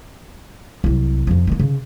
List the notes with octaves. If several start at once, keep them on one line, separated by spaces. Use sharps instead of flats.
C2 F#3
F2 F3
D#3 A#3
C#3